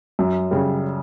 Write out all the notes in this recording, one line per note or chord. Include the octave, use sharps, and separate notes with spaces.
F#2
C#3 G3